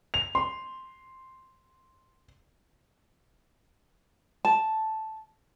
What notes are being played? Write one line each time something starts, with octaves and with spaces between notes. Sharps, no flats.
F7
C6
A5